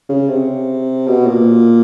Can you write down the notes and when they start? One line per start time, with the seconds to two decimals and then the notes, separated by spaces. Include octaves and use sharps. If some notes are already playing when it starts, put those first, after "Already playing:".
0.09 C#3
0.29 C3
1.08 B2
1.27 A#2